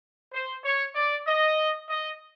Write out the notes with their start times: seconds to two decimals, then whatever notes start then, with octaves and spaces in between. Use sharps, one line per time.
0.32 C5
0.63 C#5
0.94 D5
1.26 D#5
1.89 D#5